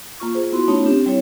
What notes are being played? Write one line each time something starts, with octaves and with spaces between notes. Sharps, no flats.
A#3 F4 C#6
F4 G#4 C5
B3 E4 F#4 C6
A3 B3 C#4 D#4 F4 C#5
C4 D4 G4
G3 C4 E4 C#5